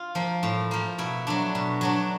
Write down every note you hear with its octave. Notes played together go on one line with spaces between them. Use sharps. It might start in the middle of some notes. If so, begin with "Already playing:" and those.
Already playing: F4
F3 A#3
A2
F3 A#3
B2 E4
F#3 A3 D4
B2
F#3 A3 D4